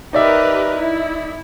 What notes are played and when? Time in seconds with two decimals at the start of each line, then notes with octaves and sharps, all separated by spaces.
0.13 D#4 G4 A#4 B4 D5 E5
0.76 E4